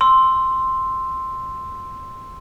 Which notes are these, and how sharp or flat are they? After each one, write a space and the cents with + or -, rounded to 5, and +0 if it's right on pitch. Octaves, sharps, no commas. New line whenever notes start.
C6 +0 E6 +0